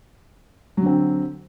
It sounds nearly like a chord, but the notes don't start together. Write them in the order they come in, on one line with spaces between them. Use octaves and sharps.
F#3 D3 C4